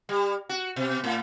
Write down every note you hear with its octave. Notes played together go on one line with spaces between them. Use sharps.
G3
F#4
B2
A2